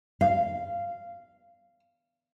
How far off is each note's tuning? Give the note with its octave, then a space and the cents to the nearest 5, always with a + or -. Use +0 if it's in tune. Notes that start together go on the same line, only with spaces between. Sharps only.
F5 -15